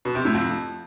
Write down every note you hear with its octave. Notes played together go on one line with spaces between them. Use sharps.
B2
C3
A2
F2